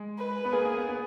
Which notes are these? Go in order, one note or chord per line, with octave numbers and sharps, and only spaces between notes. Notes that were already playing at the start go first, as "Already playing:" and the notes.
Already playing: G#3
B4
B3
A#3 G#4
A#3
B3
B3